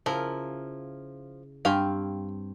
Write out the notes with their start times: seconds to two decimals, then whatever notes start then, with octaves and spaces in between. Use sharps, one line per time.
0.06 C#3 F3 E4 A#4
1.65 G2 C4 F5 G5 G#5